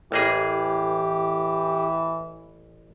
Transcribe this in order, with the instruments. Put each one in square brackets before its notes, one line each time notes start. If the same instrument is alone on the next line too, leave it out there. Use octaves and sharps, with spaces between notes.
[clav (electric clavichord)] A1 A#3 G#4 [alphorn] E3 [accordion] G4